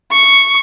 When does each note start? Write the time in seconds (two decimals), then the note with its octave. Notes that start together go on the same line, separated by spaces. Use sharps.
0.12 C#6